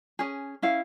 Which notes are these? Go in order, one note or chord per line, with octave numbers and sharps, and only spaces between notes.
C#4 G#4
C#4 E4 F5